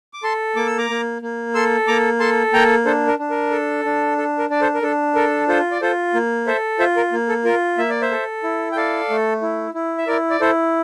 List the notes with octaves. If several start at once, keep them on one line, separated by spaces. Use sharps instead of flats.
D6
A4 A5 C6
A#3 D6
E6
A#5 D6
A#3
A#3
A4 C6 E6
A#3 A#5 D6
A4 A5 C6
A#3 G5 A#5
D4 A4 C5
A#4
D4
A#4
A4
D4
A4
A#4
D4 D5
A4 C5
A#4
D4 A4
A4 A#4
F4 A4 C5
D5
F4 A4 C5
A#3
A4 C5 E5
F4 C5 E5
A#4
A#3
A4
F4 A#4
A#3 E5
D5
C5 E5
A4
E4
G5
A4 D5 F5
A3
E4
E4
E5
E4 A#4 D5
D5
E4 A4 C5